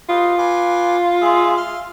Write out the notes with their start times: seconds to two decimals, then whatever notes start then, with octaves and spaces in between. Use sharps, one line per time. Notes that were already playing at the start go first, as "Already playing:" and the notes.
0.09 F4 G4 B4 D#5
0.38 B4 G#5 D6
1.22 G#3 G#4 E5
1.57 F5 C6 F6